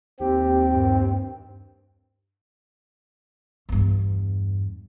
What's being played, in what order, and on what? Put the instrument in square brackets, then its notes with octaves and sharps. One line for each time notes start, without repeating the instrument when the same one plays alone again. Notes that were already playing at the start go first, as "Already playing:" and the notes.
[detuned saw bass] D#2 [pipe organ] C4 [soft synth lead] G4 [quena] G5
[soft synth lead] G2
[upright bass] E2 G2